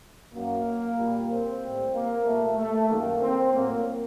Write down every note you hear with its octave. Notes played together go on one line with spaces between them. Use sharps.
F#2 F#3 A#3
A#2 G3
C4
A2 G3
A#3
A#2 G3 A3
A3
F#2 D#3 G3 A#3
C4
A2 F#3 A#3